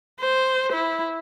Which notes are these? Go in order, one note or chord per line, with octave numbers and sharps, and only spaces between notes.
C5
E4